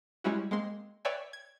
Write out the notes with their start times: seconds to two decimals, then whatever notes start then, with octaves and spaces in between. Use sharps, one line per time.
0.24 G3 G#3 C#4 E4 F#4
0.51 G#3 A#3 C4 C6
1.05 B4 C#5 D5 E5 G5 G#5
1.33 G#6